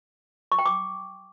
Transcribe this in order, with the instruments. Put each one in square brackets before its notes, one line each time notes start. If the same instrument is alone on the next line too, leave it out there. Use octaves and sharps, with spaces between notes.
[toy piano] C#6
G5
D6